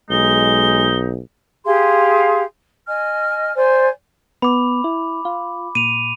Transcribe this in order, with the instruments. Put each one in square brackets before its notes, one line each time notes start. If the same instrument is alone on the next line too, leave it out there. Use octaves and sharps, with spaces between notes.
[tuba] B1 [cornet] G#3 [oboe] D#4 [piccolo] G7
[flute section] G4 G#4 F5 C6
D#5 G#5 F6
C5 D5 G#5
[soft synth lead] B3 [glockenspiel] B5 D6
[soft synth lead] E4
F4
[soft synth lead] A#2 [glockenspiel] D#7 F7